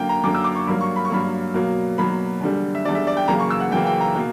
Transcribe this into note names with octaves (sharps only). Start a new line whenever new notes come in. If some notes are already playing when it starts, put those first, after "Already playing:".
Already playing: F#2 D3 A#3 G5
A#5
F#2 D3 A#3 D6
E6
D6
C#6
G2 F#3 A#3 B5
C#6
B5
C#6
G2 F#3 A#3 B5
B2 F#3 A#3
B2 F#3 A#3 B5
E2 D3 G3
E5
E2 D3 G3 D5
E5
D5
G5
F#2 C#3 E3 A#3 A#5
C#6
E6
F#5
F#2 C#3 E3 A#3 G5
G5
A#5
B2 A#3